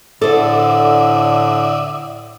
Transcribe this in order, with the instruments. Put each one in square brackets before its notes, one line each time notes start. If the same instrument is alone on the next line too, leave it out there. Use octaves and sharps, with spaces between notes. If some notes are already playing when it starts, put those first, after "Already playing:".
[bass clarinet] A2 [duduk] D3 [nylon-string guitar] A4 C5 [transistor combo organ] D5 E5 D#6